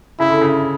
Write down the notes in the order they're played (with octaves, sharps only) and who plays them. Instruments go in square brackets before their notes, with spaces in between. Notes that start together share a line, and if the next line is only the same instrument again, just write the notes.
[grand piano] C#3 [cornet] E4
[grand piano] D3
C#3